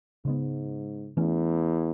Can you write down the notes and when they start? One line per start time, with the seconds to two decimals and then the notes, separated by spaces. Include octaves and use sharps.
0.25 G#2 C#3 G#3 B3
1.17 E2 E3 A3 C#4